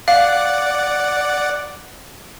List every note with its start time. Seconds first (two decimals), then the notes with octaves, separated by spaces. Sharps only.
0.08 D5 F5 F#5